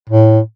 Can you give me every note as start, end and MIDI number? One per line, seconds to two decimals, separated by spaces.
0.09 0.39 45